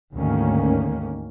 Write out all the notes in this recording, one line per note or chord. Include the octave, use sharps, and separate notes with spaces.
D2 G#2 D#3 A#3 C#4